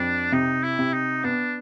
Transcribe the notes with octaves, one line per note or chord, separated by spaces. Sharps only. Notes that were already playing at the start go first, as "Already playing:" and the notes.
Already playing: F2 D4
C3 D#4
E4
C3
D#4
B3 D4